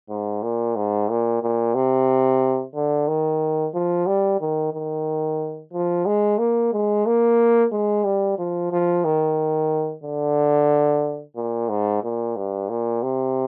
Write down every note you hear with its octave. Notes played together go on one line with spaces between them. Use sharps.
G#2
A#2
G#2
A#2
A#2
C3
D3
D#3
F3
G3
D#3
D#3
F3
G#3
A#3
G#3
A#3
G#3
G3
F3
F3
D#3
D3
A#2
G#2
A#2
G2
A#2
C3